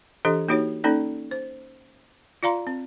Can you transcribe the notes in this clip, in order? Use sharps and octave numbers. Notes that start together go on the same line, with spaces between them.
E3 D4 G4 A4 D#5
A#3 D#4 F#4 G4 C#5
A#3 C#4 D#4 A4 D5
C5
F4 D5 F5 A#5 C6
C4